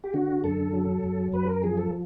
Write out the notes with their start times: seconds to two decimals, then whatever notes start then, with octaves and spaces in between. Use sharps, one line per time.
0.04 G4
0.14 D3 F#4
0.44 F#2 A4
0.73 F#3
1.03 F#2
1.33 F#2 B4
1.48 A#4
1.63 F3 G#4
1.78 A4